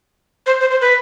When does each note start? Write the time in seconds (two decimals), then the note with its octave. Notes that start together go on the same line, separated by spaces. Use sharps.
0.47 C5
0.61 C5
0.71 C5
0.81 B4